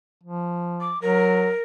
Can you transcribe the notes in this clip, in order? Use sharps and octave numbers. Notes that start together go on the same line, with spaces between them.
F3
D6
F#3 A#4